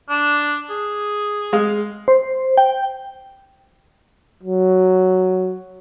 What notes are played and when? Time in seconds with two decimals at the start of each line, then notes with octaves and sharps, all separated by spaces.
0.09 D4
0.71 G#4
1.53 G#3 F5 D#6
2.08 C5
2.58 G5
4.43 F#3